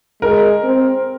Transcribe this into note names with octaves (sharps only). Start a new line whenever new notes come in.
G#3 A#4
C4